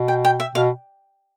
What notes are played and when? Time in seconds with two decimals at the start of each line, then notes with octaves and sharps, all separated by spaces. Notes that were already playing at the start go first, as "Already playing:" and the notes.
Already playing: B2
0.08 G5
0.25 G5
0.40 E5
0.55 B2 F5